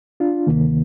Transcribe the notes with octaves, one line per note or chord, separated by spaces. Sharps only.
D4 F4
D2 C3 D#3 A#3